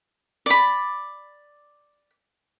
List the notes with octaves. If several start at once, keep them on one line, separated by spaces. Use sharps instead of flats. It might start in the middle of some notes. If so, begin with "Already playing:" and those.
D5 B5